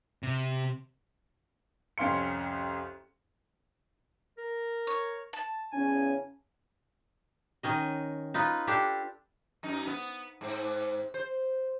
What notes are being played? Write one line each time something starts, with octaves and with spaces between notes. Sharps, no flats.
C3
C2 F2 C#4 F5 C6 C#7
A#4
C#5
A5
E2 C#3 C#4 G#5
D#3 C#4 D#5
D#4 F4 B4
D4 G4 A4
F#2 D#4
B3
G#2 C4
C5